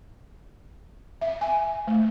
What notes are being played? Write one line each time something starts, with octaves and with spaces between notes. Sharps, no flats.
E5
G#5
A3